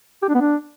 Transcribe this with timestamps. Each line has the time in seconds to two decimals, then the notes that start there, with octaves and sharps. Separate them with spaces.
0.22 G4
0.29 D4
0.35 B3
0.41 D4